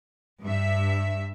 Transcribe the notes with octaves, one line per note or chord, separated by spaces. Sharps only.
G2 E5